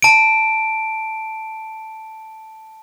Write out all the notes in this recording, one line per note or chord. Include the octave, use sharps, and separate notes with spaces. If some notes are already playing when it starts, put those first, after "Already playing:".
A5 D7